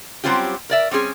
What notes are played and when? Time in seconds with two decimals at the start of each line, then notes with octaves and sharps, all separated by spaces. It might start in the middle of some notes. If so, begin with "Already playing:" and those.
0.24 F#3 G3 C4 C#4 F4 G4
0.70 A#4 D5 E5
0.91 G3 C4 C#4 G#4